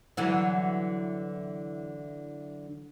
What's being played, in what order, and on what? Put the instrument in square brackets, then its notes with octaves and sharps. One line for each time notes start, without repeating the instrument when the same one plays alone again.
[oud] D3 E3 F#3